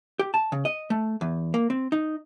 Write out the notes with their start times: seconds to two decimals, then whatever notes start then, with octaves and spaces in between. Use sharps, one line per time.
0.19 G4
0.34 A5
0.52 C#3
0.65 D#5
0.90 A3
1.21 E2
1.54 A#3
1.70 C4
1.92 D#4